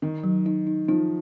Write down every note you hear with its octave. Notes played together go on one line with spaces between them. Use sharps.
D#3 D#4
F#3
D#4
D#4
F3 D#4